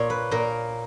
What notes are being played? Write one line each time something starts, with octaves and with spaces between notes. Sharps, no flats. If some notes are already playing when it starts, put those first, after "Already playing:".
Already playing: A#2 C#5
B4
A#2 A#4